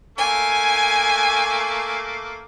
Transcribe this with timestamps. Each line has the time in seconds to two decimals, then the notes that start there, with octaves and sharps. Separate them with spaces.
0.18 A3 A#3 G#5